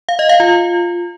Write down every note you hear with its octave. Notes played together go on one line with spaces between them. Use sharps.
F5
D#5
F5
F4